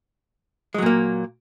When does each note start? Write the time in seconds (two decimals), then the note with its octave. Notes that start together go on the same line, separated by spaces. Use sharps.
0.74 G#3
0.78 F#3
0.82 A#2
0.86 A#3